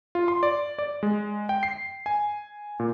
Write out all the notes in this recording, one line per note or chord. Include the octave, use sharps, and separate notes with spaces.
F4
C6
D5
D5
G#3
G5
C7
G#5
A#2